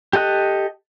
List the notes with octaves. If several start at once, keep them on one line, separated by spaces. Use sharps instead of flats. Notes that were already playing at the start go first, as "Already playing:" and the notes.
G4 A4 D#5 F#6